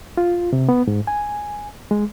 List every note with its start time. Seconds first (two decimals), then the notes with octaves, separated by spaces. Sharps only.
0.17 F4
0.53 C3
0.69 B3
0.87 G#2
1.07 G#5
1.91 G#3